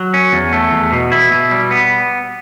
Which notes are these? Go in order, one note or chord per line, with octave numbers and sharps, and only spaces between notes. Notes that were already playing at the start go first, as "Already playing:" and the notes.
Already playing: F#3
C#4
E2
A3
E2
B2
E4
B2
G3
B3